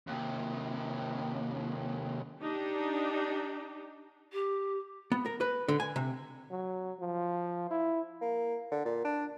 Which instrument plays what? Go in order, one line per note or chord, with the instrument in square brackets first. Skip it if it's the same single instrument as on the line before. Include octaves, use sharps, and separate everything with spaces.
[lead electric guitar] D#2 C3
[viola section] D4 D#4 G4
[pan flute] G4
[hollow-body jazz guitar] B3
A#4
B4
D3
G#5
C3
[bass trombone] F#3
F3
E4
[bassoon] A#3
D3
A#2
D4